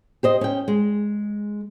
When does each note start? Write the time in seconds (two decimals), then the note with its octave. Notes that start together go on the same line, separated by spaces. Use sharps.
0.23 G4 C5 D#5
0.41 C#4 G5
0.68 G#3